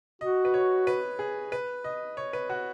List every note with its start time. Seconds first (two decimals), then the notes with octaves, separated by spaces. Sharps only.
0.21 F#4 D#5
0.45 B4
0.54 C#5
0.87 B4
1.19 G#4
1.52 B4
1.84 D#5
2.17 C#5
2.33 B4
2.50 F#4